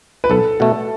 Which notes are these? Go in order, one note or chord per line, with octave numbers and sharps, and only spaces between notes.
B4
B1 A4
B2 A3